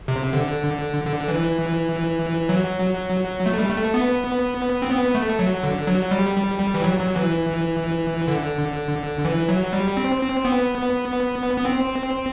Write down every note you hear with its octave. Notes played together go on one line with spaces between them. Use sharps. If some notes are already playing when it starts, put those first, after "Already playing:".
C3
D3
D3
E3
F#3
A3
G3
A3
B3
C4
B3
A3
F#3
D3
F#3
G3
G3
G3
E3
F#3
F#3
E3
D3
E3
F#3
G3
C4
C4
B3
B3
C4